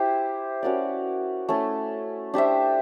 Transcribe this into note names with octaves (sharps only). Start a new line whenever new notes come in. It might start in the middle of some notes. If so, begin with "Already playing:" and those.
Already playing: E4 G4 C5
C#4 F#4 A#4 D5
A3 C#4 E4 A4
D4 G4 C5 E5